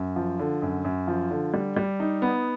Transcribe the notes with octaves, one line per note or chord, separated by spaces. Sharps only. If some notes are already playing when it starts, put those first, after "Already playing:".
Already playing: F#2
F3
D3
F#2
F#2
F3
D3
G3
G3
D#4
B3